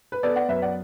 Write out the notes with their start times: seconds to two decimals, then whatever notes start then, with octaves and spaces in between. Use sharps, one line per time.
0.12 B4
0.23 B3 A4 D5
0.36 D5 F#5
0.49 F#2 B4 E5
0.62 D5 F#5